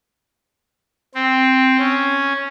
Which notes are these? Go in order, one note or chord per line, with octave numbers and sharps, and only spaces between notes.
C4
C#4